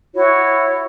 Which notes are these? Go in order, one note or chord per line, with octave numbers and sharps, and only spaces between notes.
E4 F#4 C#5